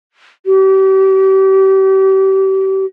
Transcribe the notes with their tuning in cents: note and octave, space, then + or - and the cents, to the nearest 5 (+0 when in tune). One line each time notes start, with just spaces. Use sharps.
G4 -35